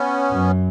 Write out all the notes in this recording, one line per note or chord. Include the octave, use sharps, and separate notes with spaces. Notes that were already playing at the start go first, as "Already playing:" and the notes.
Already playing: B3 C#4
F#2